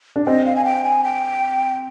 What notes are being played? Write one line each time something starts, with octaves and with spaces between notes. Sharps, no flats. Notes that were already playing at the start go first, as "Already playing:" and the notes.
D4
C4 D#5
F5
G#5
G5
G#5
G5